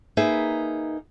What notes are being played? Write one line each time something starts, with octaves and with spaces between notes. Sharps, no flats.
A#3 D#4 G#4 B4 E5